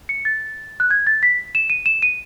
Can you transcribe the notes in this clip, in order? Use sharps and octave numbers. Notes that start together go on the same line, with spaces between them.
C#7
A6
F#6
G#6
A6
B6
E7
D#7
E7
D#7